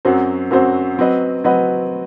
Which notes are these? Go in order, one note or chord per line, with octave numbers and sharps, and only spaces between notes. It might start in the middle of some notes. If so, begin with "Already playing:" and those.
F#2 F#3 C4 F#4 C5
F#2 F#3 C4 F#4 C5
F#3 C4 F#4 B4 D#5
F#3 C4 F#4 B4 D#5